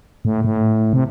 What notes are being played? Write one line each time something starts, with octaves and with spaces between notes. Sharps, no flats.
A2
A2
C3